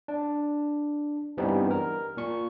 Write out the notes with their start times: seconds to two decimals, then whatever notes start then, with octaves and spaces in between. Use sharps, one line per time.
0.08 D4
1.37 G2 E3 G3 B3 C4 D#4
1.71 A#4
2.17 A#2 C#6